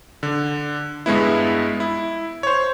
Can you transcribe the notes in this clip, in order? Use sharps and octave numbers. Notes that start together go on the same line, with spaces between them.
D3
G2 G#3 B3 E4
E4
C5 C#5